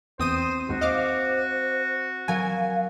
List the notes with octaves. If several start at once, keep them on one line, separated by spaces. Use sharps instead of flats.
E2 C4 C5 D#6 D#7
D#2 G#2 F#4
C5 D#5 F5 D6
F#3 A#4 F5 G#5